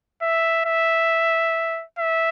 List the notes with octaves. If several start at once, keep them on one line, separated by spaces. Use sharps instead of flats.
E5
E5
E5